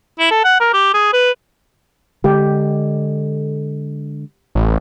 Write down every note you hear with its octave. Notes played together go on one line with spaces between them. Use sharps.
E4
A4
F#5
A#4
G4
G#4
B4
D3 G#3 G4
A1